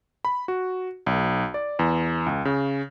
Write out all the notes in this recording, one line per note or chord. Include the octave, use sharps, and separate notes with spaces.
B5
F#4
B1
D5
E2
C#2
C#3